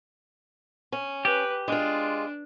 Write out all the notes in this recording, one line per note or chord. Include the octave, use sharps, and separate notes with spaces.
C#4
G4 B4
G#3 D4 F4